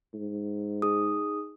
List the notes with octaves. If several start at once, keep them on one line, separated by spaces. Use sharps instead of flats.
G#2
D#4 G#4 D#6